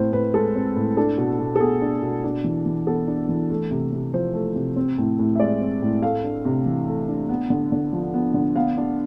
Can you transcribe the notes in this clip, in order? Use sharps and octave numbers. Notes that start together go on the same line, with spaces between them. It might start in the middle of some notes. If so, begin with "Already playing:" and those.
Already playing: A2 C4 C5
A2 B4
G#3 A4
C4
A2
D4 A4
B2
B2
A4
B3 G#4
D4
B2
D4
E3
E3
B3 A4
D4
E3
A3
C3
C3
F3 C5
A3
C3
C4
A2
A2
E5
G#3 D5
C4
A2
A3 F5
D4
C3
E3
A3
D4
B3
D3
D3
F3
B3
D3
B3 F5
D4